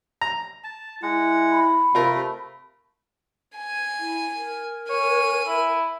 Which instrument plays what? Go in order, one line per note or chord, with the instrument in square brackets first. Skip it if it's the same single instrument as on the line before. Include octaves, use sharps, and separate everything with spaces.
[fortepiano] A#5
[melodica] A5
[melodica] G#3 F#5 [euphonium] E4
[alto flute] B5
[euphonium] C3 [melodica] A3 [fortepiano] F4 A#4
[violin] G#5
[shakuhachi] E4
A#4
[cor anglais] C#5 [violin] G#5 D#7
[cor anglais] E4